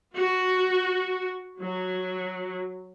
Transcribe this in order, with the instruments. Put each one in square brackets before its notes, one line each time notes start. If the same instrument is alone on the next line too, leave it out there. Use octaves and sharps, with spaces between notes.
[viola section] F#4
F#3